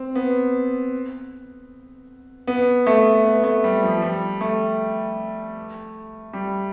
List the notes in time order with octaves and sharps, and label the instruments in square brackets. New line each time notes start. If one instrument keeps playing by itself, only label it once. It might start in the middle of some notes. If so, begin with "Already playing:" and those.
Already playing: [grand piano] C4
B3
B3
A3
B3
A3
G3
F3
G3
A3
G3